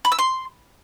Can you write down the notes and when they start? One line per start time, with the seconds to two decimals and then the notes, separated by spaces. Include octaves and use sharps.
0.05 B5
0.12 E6
0.19 C6